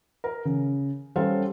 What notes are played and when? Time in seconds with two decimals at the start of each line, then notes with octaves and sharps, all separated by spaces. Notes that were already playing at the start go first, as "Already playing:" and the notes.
0.24 A#4
0.45 C#3
1.16 G3 C#4 A4 C5 F5